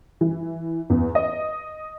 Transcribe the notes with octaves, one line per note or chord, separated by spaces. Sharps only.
E3
E2
D#5